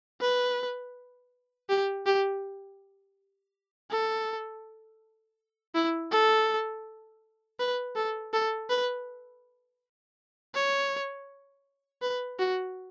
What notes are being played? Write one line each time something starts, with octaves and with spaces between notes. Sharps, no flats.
B4
G4
G4
A4
E4
A4
B4
A4
A4
B4
C#5
B4
F#4